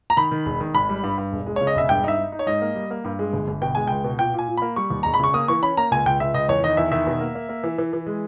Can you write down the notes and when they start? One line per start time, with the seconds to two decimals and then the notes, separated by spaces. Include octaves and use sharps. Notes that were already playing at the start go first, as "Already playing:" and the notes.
0.10 A#5
0.17 D#3 B5
0.31 D#3
0.46 E1
0.60 D#3
0.74 G#1 B5
0.89 G3
1.03 G2
1.18 G2
1.32 E1
1.46 G#3
1.56 C#3 C#5
1.67 D#5
1.75 E1 E5
1.89 G2 G5
2.04 D#4 E5
2.18 D#4
2.32 D#4
2.39 C#5
2.47 G#2 D#5
2.62 A#3
2.75 G3
2.91 A#3
3.04 G2
3.19 G#3
3.33 G1
3.48 G1
3.62 B2 G5
3.75 G#3 G#5
3.87 C#2 G5
4.04 B2
4.19 A#2 G5
4.34 A#2 G#5
4.48 A#2
4.57 A#3 B5
4.76 G3 C#6
4.90 D#2
5.03 E1 A#5
5.14 B5
5.20 C#3 C#6
5.34 A#3 D#6
5.48 E3 C#6
5.63 C#4 B5
5.77 A#3 A#5
5.91 C#2 G#5
6.06 C#2 G5
6.20 C#2 E5
6.34 C#2 D#5
6.49 E2 C#5
6.63 D#3 D#5
6.77 E2 E5
6.92 D#3 E5
7.07 B2
7.20 A#3
7.35 A#3
7.49 A#3
7.64 E3
7.78 E3
7.93 E3
8.07 G#3